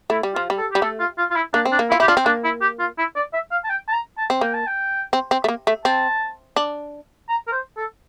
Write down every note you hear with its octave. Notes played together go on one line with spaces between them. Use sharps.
A3 E4
G3
F3 F4
G3
A4
G3 G4
A3 A4
F4
F4
F4
E4
A#3 D4
C4
D4
A#3
E4 F4
E4 G4
D4 F4
C4
A#3 D4
E4
G4
F4
E4
D5
E5
F5
A5
G5
A5
A#5
A5
C4
A#3 G5
A5
G5
C4
C4
A3
A#3
A3
C4 A5
D4
A#5
A#4
C5
A4